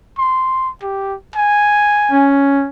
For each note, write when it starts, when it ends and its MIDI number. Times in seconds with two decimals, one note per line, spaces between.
0.18 0.69 84
0.82 1.15 67
1.36 2.29 80
2.12 2.67 61